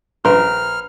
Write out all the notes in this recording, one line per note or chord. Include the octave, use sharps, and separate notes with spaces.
A#1 A#4 B4 C6 F6